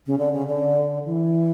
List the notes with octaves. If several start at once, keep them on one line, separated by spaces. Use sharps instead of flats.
C#3
D3
C#3
D3
E3